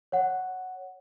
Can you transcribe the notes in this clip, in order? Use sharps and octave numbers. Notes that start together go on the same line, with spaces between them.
C#5 F#5